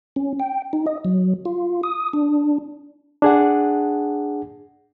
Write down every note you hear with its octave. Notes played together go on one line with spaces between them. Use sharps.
C#4
G5
D#4
D#5
F#3
F4
D#6
D4
D4 G#4 F#5